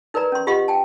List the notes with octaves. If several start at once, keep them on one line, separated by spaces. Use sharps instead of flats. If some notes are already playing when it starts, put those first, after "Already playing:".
D#4 A#4 B4 D5 A#5
C#4 C6
F4 G4 D#5 F#5 C6
G5 A5